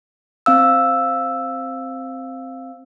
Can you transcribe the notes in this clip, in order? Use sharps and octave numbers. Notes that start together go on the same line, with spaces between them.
C4 F5 E6